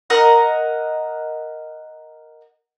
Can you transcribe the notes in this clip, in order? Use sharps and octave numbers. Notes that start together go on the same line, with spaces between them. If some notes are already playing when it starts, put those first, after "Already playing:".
A#4 D#5 F#5